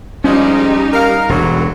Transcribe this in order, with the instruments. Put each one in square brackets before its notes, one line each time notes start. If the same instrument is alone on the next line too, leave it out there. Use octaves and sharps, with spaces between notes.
[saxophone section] F3 G#3 [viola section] G3 D#4 G4 [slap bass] C#4
[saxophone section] A#4 F5
[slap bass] E1 [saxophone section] D3 E3 F#3